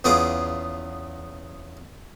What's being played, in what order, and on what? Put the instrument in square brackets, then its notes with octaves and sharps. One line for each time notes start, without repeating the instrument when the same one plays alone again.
[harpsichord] E2 C#3 B3 F4 G#4 D6